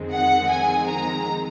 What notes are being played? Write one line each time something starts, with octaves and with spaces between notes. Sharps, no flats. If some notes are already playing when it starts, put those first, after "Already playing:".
Already playing: F2 D#3 G#3 C4
F#5
G#5
A#5